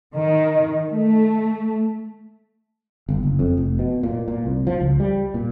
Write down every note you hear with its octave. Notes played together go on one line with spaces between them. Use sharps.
D#3
A3
G1
F#1
F2
F1
B2
A#2
A#2
C2
F3
C#2
G3
A#2